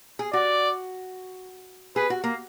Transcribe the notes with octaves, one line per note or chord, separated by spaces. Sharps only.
G#4
F#4 D5
G#4 B4
F#4
A#3